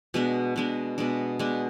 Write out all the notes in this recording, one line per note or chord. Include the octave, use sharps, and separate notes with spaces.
B2 G#3 D4
B2 G#3 D4
B2 G#3 D4
B2 G#3 D4